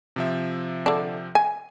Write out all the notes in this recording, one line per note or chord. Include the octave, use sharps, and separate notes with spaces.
C3 F3 E5
D3 D4
G#5